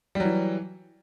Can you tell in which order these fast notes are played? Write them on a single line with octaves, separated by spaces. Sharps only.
G3 F#3 E3